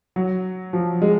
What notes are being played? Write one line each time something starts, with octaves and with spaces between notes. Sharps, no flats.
F#3
F3
G#3